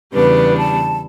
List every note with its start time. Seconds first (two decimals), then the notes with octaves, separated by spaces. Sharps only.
0.13 E2 C#3 G3 B3 D4 B4
0.58 A5